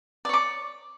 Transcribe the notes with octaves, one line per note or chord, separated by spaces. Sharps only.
C#5 D5 D6